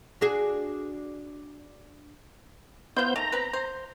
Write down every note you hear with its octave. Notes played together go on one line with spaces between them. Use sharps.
D4 F#4 G#4
B3 E4 F4 C5 G6
D#3 A3 A#5
C4 B4
C5